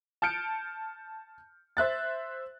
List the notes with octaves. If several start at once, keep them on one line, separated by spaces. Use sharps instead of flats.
A5 F6 G6 C#7 D7
C5 E5 F#6 A6